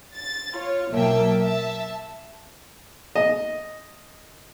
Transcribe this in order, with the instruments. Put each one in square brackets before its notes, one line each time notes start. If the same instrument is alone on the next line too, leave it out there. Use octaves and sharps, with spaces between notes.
[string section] A6
F4 C#5
B1 F#3 A#3 E5 G5 A5
E5 A5
[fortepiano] D#5